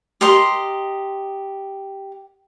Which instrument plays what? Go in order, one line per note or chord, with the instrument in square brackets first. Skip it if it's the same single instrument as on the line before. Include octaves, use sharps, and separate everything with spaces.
[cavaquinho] G4 A#4 D#5 C6